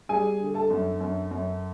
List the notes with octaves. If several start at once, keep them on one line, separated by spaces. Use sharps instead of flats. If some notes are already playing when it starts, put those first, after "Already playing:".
G3 G#4 G#5
D3
A4 A5
F#2
F#2
F#2